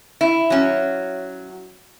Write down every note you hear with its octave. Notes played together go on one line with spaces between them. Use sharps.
E4
F#3 C#4